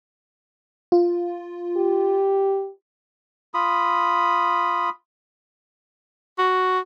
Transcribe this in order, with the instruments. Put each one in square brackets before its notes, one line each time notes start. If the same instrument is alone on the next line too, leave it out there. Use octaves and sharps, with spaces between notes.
[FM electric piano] F4
[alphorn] G4
[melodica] F4 B5 D#6
[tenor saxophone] F#4